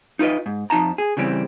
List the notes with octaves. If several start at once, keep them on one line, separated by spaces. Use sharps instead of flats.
D#4 F4 A4 B4 D#5
G#2
F2 D#4 A5 A#5
G#4
C#3 E3 G3 C4